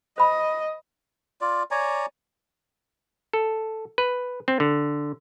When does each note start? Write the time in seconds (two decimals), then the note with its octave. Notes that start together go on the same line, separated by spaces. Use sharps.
0.18 C5 D#5 B5
1.41 F4 D5
1.71 C#5 D5 G#5 A#5
3.33 A4
3.98 B4
4.48 C4
4.60 D3